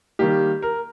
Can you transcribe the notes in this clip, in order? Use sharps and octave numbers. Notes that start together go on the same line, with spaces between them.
D#3 G3 A#3 G4
A#4